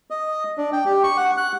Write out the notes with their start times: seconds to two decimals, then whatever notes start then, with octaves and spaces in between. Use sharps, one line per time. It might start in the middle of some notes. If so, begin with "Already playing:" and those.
0.10 D#5
0.58 D4
0.73 G5
0.85 G4
1.04 C#6
1.17 F#5
1.37 F#6